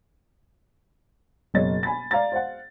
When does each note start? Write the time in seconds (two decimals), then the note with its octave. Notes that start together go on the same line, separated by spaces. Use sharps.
1.54 F#1 B2 F#3 C#5 D#5 A6
1.83 G#5 B5 A6
2.11 D5 F5 A#5 A6
2.32 C5 F5 F#5